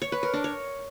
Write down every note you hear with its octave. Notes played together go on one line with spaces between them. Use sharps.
C#5
B4
A#4
D4
C#5